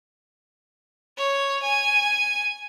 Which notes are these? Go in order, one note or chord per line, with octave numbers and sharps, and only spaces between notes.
C#5
G#5